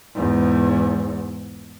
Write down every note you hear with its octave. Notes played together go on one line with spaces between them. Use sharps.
E2 G#2